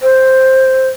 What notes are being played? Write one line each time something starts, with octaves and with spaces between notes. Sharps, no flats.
C5